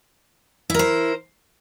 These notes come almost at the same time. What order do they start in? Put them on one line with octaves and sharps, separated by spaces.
E4 A#4 C5